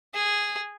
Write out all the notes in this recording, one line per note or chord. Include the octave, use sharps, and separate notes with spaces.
G#4